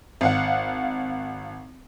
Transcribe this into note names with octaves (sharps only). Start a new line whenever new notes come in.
G#1 F5 F#5